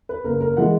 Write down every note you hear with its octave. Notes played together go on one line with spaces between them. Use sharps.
B4
F#1 A#4
A#4
E3 G#3 F#5